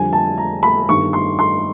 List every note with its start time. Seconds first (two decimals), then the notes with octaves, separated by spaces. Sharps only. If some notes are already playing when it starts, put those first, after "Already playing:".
Already playing: F2 D3 G3 G#5
0.13 A5
0.38 A#5
0.63 B5
0.88 G1 G2 D#3 G3 C#6
1.13 C6
1.39 C6